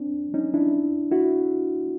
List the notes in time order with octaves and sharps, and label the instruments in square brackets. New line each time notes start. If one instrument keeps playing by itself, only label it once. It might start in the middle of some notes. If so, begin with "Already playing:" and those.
Already playing: [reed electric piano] C4 D4
C#4 D#4
D4 E4
E4 F#4